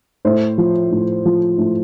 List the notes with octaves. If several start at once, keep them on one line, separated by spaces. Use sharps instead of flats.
A2 C5
F3
A2
F3
A2